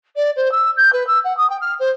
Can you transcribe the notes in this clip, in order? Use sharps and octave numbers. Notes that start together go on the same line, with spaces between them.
D5
C5
E6
G6
B4
E6
F#5
D#6
G5
F6
C5